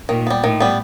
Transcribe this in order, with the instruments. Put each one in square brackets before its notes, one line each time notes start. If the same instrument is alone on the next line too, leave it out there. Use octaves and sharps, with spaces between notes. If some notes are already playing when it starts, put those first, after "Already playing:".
[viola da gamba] A#2 [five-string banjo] D#3
[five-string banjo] G3 B3
[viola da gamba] A2 [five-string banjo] D#3
[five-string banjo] G3 B3